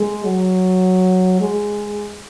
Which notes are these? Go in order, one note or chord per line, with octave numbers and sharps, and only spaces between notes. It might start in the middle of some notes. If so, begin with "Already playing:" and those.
Already playing: G#3
F#3
G#3